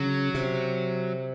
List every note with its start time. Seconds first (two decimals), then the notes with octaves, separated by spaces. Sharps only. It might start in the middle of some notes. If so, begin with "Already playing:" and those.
Already playing: C#3 F#3
0.34 C3